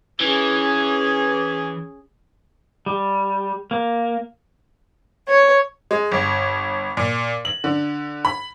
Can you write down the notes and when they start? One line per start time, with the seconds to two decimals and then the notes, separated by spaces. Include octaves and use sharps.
0.20 E3 C#4 G#4
2.86 G3
3.71 A#3
5.28 C#5
5.91 G#3
6.11 G1
6.97 A#2
7.45 F#7
7.64 D3
8.25 B5